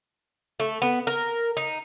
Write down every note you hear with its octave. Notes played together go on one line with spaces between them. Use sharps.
A3
B3
A#4
D#4